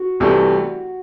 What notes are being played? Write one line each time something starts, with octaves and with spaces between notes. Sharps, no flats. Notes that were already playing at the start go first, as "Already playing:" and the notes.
Already playing: F#4
C2 C3 E3 A3